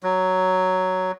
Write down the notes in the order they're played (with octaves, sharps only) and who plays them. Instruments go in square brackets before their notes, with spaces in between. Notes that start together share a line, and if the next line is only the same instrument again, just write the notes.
[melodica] F#3